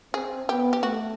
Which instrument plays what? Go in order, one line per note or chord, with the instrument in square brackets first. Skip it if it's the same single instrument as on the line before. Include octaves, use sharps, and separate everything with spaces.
[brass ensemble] C4 [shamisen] G#4
[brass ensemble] B3 [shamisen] G4
[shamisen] G4
[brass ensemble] A3 [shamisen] F#4